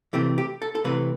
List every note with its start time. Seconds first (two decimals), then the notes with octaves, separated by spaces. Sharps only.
0.13 C3 E3 A3 C4 G4
0.38 G4
0.62 A4
0.75 A4
0.84 C3 E3 A3 C4 B4